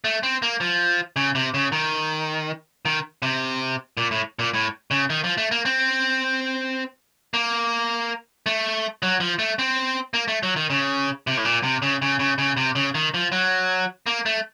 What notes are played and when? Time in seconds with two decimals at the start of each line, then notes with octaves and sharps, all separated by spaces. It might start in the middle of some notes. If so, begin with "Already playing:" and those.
0.04 A3
0.23 C4
0.42 A#3
0.60 F3
1.16 C#3
1.35 C3
1.54 C#3
1.72 D#3
2.85 D#3
3.22 C3
3.97 A#2
4.11 A2
4.39 A#2
4.54 A2
4.91 C#3
5.10 D#3
5.24 F3
5.38 A3
5.51 A#3
5.65 C4
7.34 A#3
8.46 A3
9.03 F#3
9.20 F3
9.39 A3
9.59 C4
10.14 A#3
10.28 A3
10.43 F#3
10.56 D#3
10.70 C#3
11.27 C3
11.37 A2
11.45 A#2
11.63 C3
11.82 C#3
12.02 C#3
12.19 C#3
12.38 C#3
12.57 C3
12.76 C#3
12.95 D#3
13.14 F3
13.32 F#3
14.06 A#3
14.26 A3